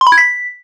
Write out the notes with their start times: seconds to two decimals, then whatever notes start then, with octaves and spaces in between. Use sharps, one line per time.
0.01 C6
0.07 B5
0.12 G#6
0.18 B6